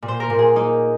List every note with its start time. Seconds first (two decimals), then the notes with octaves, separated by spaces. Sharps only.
0.02 A#2
0.08 C5
0.20 A#4
0.30 A#2
0.39 G#4
0.56 A#3 D#4